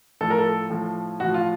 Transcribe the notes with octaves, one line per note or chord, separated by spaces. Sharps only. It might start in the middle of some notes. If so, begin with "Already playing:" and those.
A2 F3 A4
A#4
A4
A2 F3
A2 F3 F#4
F4